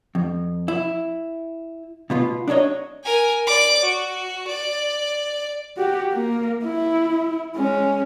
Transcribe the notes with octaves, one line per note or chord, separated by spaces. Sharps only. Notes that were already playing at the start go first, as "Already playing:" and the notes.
F2
E4
B2 B3 F4
D4 D#4 F#4 C#5 D#5
A#4 G#5
D5 D6
F#4
D5
F#4 G4
A#3
E4
G#3 C#4